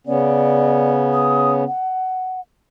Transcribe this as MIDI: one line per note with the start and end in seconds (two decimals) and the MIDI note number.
0.07 1.64 49
0.07 1.64 59
0.07 1.64 61
0.07 0.91 74
1.13 1.52 87
1.67 2.40 78